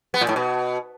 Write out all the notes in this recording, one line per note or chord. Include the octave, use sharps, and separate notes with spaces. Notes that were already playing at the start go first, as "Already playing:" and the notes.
B3
A#2
A2
B2